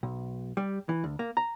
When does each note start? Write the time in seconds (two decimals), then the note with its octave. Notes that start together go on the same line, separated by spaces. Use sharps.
0.03 B1
0.57 G3
0.89 E3
1.04 D2
1.19 A#3
1.37 A#5